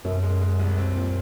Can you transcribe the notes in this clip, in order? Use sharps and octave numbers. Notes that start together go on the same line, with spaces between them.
F#2 B2
G#3
G#3
C2
C4
A#2